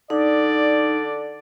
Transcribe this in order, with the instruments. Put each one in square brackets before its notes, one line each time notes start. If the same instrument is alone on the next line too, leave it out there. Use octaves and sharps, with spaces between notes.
[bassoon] D3 [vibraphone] D#4 [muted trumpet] D5